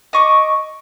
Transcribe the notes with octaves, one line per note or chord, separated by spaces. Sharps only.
D#5 C#6 D6